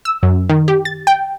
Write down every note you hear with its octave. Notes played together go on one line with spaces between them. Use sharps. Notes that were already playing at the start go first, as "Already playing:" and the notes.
E6
F#2
D#3
G4
A6
G5